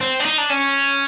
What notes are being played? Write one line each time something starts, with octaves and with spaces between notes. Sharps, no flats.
C4
D4
D#4
D4
C#4